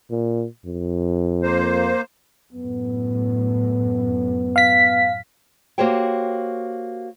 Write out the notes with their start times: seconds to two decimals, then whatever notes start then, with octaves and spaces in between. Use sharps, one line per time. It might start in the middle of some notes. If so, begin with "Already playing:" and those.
0.11 A#2
0.65 F2
1.43 A#3 C5
2.53 F#2 A2 B3
4.56 F5 B6
5.78 A#3 F#4 G4 C5 C#5 G5